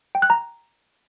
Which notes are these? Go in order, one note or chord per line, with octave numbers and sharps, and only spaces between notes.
G5
F#6
A#5